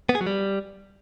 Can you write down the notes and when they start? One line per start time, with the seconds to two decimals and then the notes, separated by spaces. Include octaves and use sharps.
0.09 B3
0.15 G#4
0.21 F#3
0.26 G3